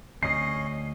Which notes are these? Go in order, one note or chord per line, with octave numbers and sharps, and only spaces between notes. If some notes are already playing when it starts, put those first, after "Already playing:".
D2 C#4 D#5 C7